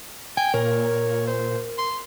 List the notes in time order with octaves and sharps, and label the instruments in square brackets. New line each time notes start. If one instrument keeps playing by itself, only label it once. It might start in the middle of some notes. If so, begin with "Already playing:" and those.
[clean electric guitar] G5 [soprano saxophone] G#5
[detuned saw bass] A#2 [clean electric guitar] A#4 [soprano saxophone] C#5
[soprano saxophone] C5
C6